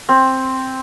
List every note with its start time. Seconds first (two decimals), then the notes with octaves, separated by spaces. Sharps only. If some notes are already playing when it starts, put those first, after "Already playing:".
0.09 C4